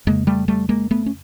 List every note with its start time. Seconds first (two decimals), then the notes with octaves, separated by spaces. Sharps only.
0.07 F2 C#3 G#3 A#3
0.27 G3 A3
0.48 G3 A3
0.69 G#3 A#3
0.91 A3 B3
1.06 C#4